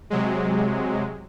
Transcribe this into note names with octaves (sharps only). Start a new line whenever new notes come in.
C3 F#3 G#3